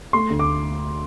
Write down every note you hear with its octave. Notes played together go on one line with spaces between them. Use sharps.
A3 C6
D2
D6